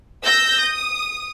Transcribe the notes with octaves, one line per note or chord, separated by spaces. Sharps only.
E6 G6 A#6
D#6